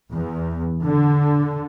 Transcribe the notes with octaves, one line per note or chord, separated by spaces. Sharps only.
E2
D3